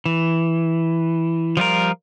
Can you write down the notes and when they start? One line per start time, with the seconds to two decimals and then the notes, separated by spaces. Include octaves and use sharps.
0.06 E3
1.57 F3 G3 F4 A#4